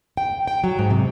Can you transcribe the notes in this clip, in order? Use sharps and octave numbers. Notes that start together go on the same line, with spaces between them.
G5
G5
F#3
G#2
C3